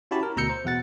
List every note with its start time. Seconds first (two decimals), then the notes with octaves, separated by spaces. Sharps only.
0.11 C#4 E4 F#4 G4 A5 B5
0.23 A#4
0.36 D2 B2 A#5 E6 G6 C#7
0.50 C5
0.65 E2 B2 F#5 A6